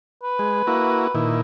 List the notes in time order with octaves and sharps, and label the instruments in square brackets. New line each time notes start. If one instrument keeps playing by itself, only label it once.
[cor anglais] B4
[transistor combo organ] G#3
A#3 E4 F#4
A#2 D#3 E4